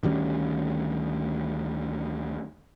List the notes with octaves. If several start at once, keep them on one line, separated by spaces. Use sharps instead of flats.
D2 D#3 G3 C#4